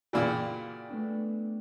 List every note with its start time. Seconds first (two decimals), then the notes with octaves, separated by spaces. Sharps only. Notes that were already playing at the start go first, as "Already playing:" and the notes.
0.13 A#2 C#3 E3 F#4 D5 G5
0.90 A3 B3 D4